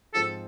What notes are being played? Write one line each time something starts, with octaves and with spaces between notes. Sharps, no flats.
G#2 F3 G#3 C4 F4 A4